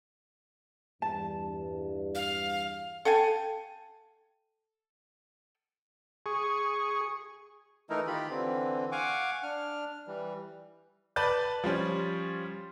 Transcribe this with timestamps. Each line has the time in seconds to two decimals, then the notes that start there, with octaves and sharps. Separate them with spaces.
1.02 E2 G2 A5
2.15 F5
3.05 A4 F5 G5 G#5
6.26 G#4 C#6
7.90 E3 A3 D#4 E4 A#4
8.07 D#3 F4 G4 B5
8.30 D3 E3 C4
8.92 F5 F#5 G#5 C#6 D6
9.43 D4 F6
10.07 E3 G3
11.16 B4 D5 A5 G6
11.64 F3 G3 C#4